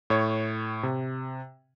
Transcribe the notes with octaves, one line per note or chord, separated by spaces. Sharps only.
A2 C#5
C3